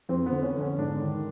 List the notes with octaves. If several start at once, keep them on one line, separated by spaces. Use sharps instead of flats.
F2 C4
B3
D3
C#4
D3
C#4
G#2 D4
D#3